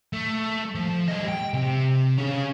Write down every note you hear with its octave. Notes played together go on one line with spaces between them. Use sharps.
A3
F3
G3 D#5
G5
C3
C#4 G#4